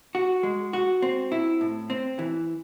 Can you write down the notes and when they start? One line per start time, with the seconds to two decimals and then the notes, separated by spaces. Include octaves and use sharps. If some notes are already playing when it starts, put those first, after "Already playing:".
0.15 F#4
0.43 G#3
0.73 F#4
1.02 C4
1.32 E4
1.61 A2
1.90 C4
2.19 E3